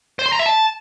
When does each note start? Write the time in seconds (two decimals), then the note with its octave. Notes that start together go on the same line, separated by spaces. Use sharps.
0.19 C5
0.26 C6
0.32 A#5
0.39 E5
0.46 A5